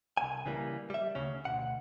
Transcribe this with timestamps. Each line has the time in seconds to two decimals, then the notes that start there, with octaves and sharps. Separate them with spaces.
0.17 C2 G#5
0.46 C#3 E3 G3 A#3
0.90 G3 E5
1.15 D2 C#3 C#4
1.45 D2 B2 F#5